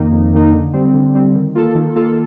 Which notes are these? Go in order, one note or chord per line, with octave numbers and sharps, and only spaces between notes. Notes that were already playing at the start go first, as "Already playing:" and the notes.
Already playing: F2 D#3 A#3 D#4
F2
D#3 A#3 D#4
D3
G3 C4
D3
G3 C4
D#3
A#3 F4 A4
D#3
A#3 F4 A4